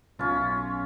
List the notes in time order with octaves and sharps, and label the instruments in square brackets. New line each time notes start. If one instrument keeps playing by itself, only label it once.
[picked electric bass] B1 [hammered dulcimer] C#4 F4